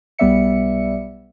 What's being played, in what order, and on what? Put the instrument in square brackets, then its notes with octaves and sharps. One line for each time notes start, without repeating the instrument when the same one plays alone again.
[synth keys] B1 G3 B3 D5 E5 C#7